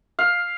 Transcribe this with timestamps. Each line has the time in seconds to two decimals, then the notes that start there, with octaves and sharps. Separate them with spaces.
0.19 F5